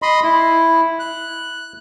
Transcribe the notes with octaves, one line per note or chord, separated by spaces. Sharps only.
D#5 B5 C6
E4
F#6